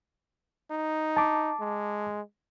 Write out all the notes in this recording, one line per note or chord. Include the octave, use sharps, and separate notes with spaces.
D#4
A5 D6
G#3